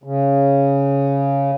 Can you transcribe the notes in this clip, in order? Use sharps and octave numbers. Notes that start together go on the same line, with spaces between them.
C#3